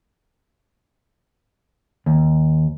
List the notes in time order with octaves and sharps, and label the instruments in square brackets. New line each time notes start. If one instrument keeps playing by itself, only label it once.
[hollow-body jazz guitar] D#2